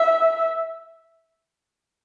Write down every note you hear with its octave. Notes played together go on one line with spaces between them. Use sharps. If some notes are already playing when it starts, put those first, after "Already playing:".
Already playing: E5